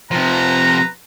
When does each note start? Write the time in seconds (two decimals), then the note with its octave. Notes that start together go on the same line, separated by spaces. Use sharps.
0.11 C3 F3 B4 A#5